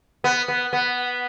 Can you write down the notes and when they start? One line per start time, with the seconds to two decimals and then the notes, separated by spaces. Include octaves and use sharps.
0.24 B3
0.48 B3
0.73 B3